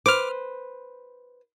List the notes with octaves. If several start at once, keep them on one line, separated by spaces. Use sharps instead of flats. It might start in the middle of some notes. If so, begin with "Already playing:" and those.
B4 C5 D6 F6